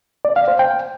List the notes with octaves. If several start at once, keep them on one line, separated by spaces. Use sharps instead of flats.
D5
F5
C5
G5